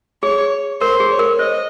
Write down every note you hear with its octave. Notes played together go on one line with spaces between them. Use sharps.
G#4 C#5
A#4 C5
G#4
C#5
A#4
C5 D#5